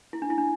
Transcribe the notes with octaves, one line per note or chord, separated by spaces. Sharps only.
E4
D4
E4
D4